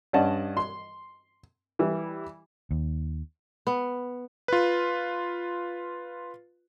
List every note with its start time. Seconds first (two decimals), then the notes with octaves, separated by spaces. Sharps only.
0.13 G2 C#4 D5 D#5 F#5 A5
0.57 C6
1.79 E3 G3 E4
2.71 D#2
3.67 B3
4.48 F4 B4